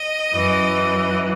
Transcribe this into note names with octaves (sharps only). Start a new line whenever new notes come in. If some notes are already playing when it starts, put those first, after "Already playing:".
Already playing: D#5
F#2 E3